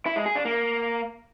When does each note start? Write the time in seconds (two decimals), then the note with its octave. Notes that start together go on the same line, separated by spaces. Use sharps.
0.06 E4
0.16 G#3
0.26 G#4
0.35 D4
0.45 A#3